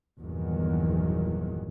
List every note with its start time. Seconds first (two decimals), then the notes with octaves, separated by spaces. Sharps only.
0.20 G1 E2 A#2 D#3 F#3